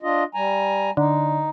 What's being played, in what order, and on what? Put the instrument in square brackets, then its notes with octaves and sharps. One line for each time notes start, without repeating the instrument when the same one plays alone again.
[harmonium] D4 F4 D#5
G3 G#5 A#5
[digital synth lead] D3 [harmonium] D#4